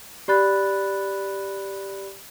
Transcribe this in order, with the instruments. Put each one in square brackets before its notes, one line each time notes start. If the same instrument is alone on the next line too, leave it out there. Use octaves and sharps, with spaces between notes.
[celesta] G4 D5 B5 F#6 A6